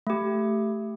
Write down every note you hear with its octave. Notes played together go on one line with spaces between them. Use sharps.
A3 G4